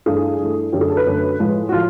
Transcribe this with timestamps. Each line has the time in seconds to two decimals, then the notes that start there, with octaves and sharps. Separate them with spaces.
0.06 G2 E3 A3 G#4
0.39 G2 E3 A3
0.72 F#2 D3 F#3 A3 G4
0.81 G#4
0.90 A4
0.97 B4
1.06 F#2 D3 F#3 A3
1.39 A2 F3 G#3
1.69 F#4
1.72 A2 F3 F4